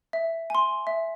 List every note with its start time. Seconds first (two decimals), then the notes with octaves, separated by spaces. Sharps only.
0.13 E5
0.50 G#5 C6
0.87 E5